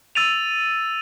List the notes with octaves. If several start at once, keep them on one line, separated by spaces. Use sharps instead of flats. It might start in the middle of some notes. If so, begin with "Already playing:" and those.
E6 A6 D#7 F7